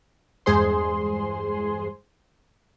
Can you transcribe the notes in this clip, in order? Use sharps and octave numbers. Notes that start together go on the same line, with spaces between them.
E2 G2 G#3 G#4 C5 C6